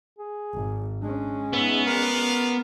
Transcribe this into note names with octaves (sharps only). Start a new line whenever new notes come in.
G#4
G#1
G#3 C#4 D4
B3 D#4 E5
D4 F4 A#4 F5